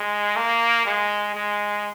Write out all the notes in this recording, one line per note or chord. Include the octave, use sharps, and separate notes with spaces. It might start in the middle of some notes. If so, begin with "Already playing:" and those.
Already playing: G#3
A#3
G#3
G#3